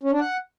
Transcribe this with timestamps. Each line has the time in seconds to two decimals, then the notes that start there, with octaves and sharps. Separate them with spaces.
0.03 C#4
0.12 D4
0.20 F#5